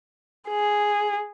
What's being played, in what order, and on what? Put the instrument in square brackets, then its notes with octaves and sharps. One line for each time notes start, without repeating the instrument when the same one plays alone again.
[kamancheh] G#4